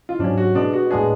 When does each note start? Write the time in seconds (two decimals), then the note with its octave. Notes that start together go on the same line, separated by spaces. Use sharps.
0.09 F4
0.19 G#2 F#3 C#4 D4
0.38 F#4
0.55 B2 G#3 B3 D4
0.73 F#4
0.90 A2 G#3 B3 D4 G#4